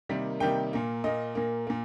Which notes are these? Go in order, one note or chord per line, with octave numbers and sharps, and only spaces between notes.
C3 D#3 G3 A#3
C3 D#3 G3 A#3 G5
A#2 A#3
A#2 A#3 D#5
A#2 A#3
A#2 A#3